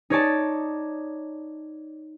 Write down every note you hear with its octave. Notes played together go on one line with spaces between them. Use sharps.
D#4 C#5 D5 A5